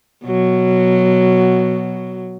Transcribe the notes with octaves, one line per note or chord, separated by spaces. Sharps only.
B2 F#3